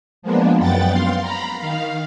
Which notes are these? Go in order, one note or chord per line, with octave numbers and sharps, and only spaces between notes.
F3 G#3 A#3 B3 D4
F#2 B3 F#5 G5 A6
F5 C6
A#5 B5
D#3 F5